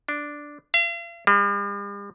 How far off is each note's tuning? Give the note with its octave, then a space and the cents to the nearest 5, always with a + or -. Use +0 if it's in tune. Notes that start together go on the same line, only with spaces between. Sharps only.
D4 +0
F5 -45
G3 +45